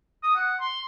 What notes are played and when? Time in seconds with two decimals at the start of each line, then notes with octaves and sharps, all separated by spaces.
0.23 D#6
0.36 F#5
0.60 C6